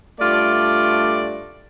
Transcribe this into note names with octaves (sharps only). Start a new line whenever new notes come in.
G2 A3 F4 D5